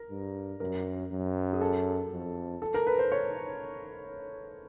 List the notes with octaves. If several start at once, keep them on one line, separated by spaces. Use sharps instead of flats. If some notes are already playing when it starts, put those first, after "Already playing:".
Already playing: A#4
G2
F#2 A#4
F#2
G#4
A4
F2
A4
A#4
B4
C5
C#5